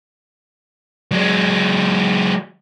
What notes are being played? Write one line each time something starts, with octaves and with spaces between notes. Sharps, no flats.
F#3 G#3